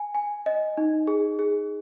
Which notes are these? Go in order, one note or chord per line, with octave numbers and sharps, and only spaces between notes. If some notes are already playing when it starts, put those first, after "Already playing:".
Already playing: G#5
G#5
D#5
D#4
G#4
G#4